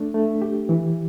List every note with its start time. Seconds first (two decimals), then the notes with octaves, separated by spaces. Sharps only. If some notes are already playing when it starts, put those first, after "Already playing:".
Already playing: A3 D4
0.14 A3
0.42 G4
0.69 E3